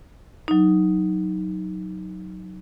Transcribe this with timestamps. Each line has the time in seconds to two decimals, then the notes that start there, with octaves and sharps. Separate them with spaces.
0.48 F#3 D#4